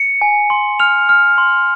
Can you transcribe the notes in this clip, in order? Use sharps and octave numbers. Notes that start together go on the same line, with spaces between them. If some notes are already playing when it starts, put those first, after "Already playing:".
Already playing: C#7
G#5
C6
F6 F7
F6
C6